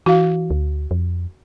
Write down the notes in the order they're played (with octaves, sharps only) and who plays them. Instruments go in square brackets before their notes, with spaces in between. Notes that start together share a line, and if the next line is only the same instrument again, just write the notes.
[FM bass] E3 [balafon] F#4 F5
[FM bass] D2
F2